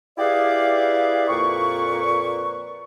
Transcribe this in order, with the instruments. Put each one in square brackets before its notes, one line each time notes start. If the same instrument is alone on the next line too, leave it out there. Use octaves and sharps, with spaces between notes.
[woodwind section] E4 G4 G#4 B4 D5 F5
F2 A#2 B4 D5 C#6